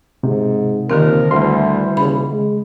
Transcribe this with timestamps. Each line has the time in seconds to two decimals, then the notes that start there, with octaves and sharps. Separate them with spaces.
0.23 G#2 C3
0.90 D#2 D3 D#3 F3 C4 A#4
1.31 D2 E3 G3 C6
1.97 D#1 C#3 B5
2.31 G#3